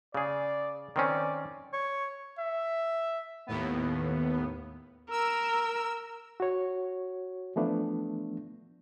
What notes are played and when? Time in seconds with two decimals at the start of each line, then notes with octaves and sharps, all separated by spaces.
0.14 C#3 G#4 D5
0.96 D#3 C4 C#4 D5
1.73 C#5
2.38 E5
3.47 D#2 A2 B3
5.10 A#4 E6
6.40 F#4 C#5
7.56 E3 F3 A3 B3 D4